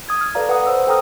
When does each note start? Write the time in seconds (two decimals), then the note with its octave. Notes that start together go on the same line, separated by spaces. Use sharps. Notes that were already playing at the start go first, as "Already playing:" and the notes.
0.09 D#6 G#6
0.21 F6
0.35 A4 B4 D5 F5 A#5
0.49 B4 F#5 A#5 D#6
0.67 C5 E6
0.87 A4 G5 A#5 D#6 F6